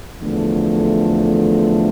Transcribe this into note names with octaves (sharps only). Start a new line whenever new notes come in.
E2 D3 F3 A3